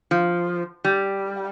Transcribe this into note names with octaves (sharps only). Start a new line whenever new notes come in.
F3
G3